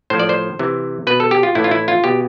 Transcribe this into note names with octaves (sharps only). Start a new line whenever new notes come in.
A2 F3 C5
D5
C5
C3 E3
B2 B4
A4
G4
F4
A2 E3 E4
F4
E4
F4
B2 G4